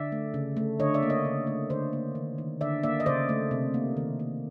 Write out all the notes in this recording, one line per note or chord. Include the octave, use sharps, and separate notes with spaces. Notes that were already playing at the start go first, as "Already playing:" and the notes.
Already playing: D3 D5 E5
A3
C#3
A3
D3 C#5 D#5
D5 E5
A#3
C#5 D#5
C#3
A3
D3 C5 D5
A#3
D#3
D#3
D3 D5 E5
A#3 D5 E5
D#5
C#3 C5 D5
A3
C3
A#3
D#3
A#3